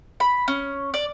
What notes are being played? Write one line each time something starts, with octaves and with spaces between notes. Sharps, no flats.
B5
C#4
D5